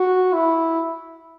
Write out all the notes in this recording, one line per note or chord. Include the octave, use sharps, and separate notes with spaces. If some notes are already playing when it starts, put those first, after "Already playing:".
Already playing: F#4
E4